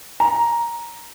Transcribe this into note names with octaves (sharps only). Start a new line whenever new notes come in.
A#5